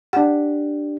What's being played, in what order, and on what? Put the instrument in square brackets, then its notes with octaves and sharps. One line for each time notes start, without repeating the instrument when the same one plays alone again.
[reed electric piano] D4 G4 [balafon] F#5